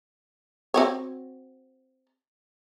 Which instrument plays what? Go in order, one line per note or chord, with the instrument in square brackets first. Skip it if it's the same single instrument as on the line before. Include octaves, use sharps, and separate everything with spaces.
[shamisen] C4 F#4 C#5